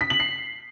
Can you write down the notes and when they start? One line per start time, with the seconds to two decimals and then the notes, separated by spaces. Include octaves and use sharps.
0.01 B6
0.10 F#7
0.20 C7